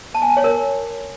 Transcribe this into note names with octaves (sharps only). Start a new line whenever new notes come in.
A5
G#5
A5
C#5
A#4